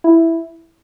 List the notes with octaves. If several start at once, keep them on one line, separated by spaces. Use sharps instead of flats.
E4